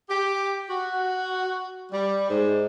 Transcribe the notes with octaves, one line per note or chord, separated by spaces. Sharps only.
G4
F#4
G3
G#2